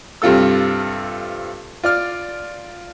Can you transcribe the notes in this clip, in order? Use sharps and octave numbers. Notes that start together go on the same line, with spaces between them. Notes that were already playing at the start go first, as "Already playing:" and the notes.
G2 C3 C4 F4 A4 E6
F4 D5 F6